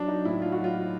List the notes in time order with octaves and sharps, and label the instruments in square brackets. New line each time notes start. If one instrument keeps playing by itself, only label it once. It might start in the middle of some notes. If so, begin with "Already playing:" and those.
Already playing: [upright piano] F#3 D4
D#4
A2 E4
F4
F#4
F#3
F4